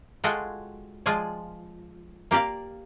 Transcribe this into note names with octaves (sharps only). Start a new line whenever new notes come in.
G#3 F4 F#4 G#4 A4 G5
F3 G#3 F4 D5 G#5 A5
A#3 G4 A#4 D5 F5